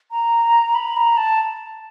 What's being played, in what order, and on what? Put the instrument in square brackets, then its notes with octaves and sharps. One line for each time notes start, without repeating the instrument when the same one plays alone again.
[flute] A#5
B5
A#5
A5